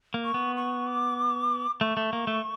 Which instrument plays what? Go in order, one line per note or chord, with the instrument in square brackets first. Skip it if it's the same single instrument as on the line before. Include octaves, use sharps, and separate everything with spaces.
[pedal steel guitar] A#3
[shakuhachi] C#6
[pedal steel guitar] B3
[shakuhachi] C#6
D6
[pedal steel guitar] A3 [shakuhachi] C#6
[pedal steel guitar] A3
A#3
A3